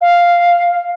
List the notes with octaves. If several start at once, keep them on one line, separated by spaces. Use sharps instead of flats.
F5